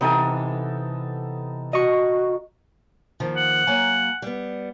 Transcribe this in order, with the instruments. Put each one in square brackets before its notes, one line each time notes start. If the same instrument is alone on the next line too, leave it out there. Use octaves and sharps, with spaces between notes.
[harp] C3 E3 G#5 [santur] B3 D#4 A4
[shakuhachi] F#4 [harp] D#5 C#6
[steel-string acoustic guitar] D#2 D#3 F3
[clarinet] F#5
[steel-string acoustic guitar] F#3 A#3 G#5
G3 B3